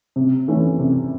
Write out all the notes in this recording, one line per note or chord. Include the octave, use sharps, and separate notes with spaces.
C3
E3 A3 C#4
C3